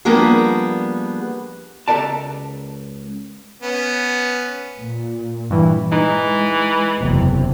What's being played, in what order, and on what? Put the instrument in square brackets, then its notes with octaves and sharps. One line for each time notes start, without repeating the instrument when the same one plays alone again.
[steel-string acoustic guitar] F3 G3 A#3 B3 D4 G#4
[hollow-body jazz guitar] C#2 G4 A4 A#4 D5 A5
[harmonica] B3 C#4
[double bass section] A#2
[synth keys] G2 E3
[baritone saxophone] E3 [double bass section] G#3 [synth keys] D#4
[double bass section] F#1 E2 C3